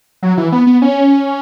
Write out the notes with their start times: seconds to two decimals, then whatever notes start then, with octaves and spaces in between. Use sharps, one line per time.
0.23 F#3
0.37 E3
0.52 B3
0.67 B3
0.82 C#4